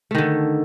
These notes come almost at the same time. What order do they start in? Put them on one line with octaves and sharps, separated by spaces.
A3 D#3 D3